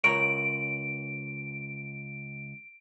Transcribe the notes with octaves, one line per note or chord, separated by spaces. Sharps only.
C#2 A#4 C#5 D7